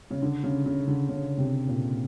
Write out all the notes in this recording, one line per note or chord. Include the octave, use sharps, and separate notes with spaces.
C#3
D3
C#3
C#3
D3
C#3
C3
A#2